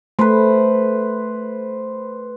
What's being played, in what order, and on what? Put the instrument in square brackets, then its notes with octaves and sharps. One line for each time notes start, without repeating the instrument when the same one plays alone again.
[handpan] A3 [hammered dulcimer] B4 C5